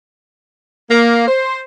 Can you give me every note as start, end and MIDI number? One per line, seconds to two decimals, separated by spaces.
0.91 1.24 58
1.27 1.61 72